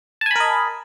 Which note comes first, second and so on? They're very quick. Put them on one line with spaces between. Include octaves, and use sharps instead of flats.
A5 G#5 B5 A#4 D#5